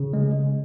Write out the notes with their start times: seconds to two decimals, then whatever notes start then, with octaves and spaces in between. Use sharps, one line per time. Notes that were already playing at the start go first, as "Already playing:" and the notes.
Already playing: C#3
0.13 G#3